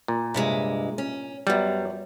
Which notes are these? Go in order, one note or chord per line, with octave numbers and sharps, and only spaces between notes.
A#2
G2 C3 G#3
C#4
F#2 F#3 G3 B3